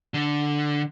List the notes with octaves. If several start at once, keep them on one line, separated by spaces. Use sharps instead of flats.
D3